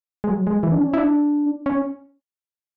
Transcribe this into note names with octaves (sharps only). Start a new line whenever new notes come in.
G#3
F#3
G#3
E3
D4
C#4
E4
D4
C#4